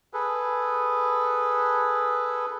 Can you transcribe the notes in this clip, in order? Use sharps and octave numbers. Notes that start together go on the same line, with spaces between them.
G#4 A4 B4